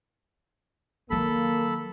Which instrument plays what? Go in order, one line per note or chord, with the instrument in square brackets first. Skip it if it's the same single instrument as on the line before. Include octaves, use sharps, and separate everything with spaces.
[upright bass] D#3 F#3 [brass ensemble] A#3 [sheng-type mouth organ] A4 B5